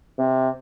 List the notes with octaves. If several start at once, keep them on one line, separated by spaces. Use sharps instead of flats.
C3